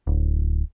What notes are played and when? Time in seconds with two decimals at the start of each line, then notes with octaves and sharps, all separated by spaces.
0.07 D1